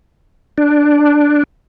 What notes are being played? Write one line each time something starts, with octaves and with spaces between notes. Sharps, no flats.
D4